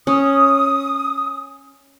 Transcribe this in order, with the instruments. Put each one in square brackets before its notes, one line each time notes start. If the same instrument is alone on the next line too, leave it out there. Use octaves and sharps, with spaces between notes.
[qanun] C#4 [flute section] D#6